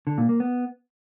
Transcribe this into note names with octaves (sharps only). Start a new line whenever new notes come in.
D3
A#2
A#3
B3